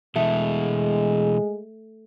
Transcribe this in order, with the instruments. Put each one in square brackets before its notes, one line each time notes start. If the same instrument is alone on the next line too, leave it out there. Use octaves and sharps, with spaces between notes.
[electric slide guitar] B2 E3 [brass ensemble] G#3 [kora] A3